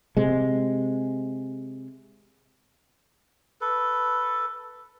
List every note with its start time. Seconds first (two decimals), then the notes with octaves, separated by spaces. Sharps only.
0.17 C3 G#3
3.61 A4 B4